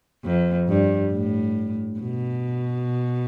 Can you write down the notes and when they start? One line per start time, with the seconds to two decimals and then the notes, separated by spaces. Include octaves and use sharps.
0.24 F2
0.68 G2
1.12 A2
2.00 B2